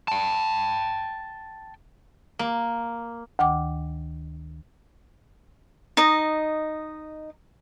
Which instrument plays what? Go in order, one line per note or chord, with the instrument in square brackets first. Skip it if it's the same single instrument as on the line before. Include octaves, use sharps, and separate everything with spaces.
[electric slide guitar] G5 A5
[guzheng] A#3
[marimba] D2 D#3 G5 D6
[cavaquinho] D#4 D#5